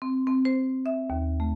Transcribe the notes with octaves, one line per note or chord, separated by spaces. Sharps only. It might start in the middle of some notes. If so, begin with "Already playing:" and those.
C4
C4
C5
E5
D#2
A3